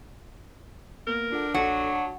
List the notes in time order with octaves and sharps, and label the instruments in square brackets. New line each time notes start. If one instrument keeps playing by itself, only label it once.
[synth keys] A#3 B3 [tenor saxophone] A#4
[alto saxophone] D4 [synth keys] F4 A4 F#5
[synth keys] A#1 A4 [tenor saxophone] F#3 [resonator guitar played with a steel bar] F#4
[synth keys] A5